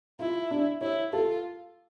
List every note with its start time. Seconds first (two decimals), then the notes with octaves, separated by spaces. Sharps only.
0.19 E4 F4
0.51 D4
0.81 E4 C#5
1.13 F4 A4